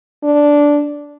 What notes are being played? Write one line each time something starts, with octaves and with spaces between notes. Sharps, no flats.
D4